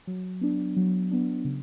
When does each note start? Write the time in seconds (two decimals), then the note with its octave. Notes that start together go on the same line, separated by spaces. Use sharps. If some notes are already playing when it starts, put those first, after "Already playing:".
0.07 F#3
0.41 B3 D4
0.76 F#3
1.11 B3 D4
1.45 C#3